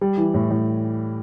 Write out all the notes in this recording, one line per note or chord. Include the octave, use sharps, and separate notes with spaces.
G3
E3
A2
A2